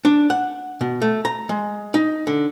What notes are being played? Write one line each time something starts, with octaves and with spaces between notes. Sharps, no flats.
D4
F#5
B2
A3
A#5
G#3
D#4
D3